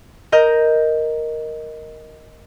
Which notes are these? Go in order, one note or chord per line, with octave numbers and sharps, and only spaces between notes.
A#4 D#5 G6